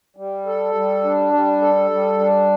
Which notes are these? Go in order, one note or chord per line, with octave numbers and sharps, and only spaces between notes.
G3
A4
G3
D4
G3
A4
G3
D4